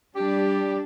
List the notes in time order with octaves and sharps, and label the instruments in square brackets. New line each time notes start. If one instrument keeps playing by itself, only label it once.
[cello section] G3 D4 [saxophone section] G4